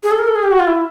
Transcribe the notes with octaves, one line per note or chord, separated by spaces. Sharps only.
G#4
A4
A#4
A4
G#4
G4
F#4
F4
E4